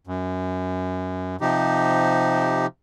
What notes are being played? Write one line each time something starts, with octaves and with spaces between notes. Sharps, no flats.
F#2
C3 F3 D#4 G4